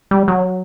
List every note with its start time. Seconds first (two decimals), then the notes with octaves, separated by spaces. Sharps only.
0.11 G3
0.28 F#3